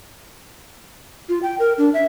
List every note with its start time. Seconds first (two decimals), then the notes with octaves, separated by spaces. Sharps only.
1.29 F4
1.43 G5
1.59 A#4
1.78 D4
1.94 E5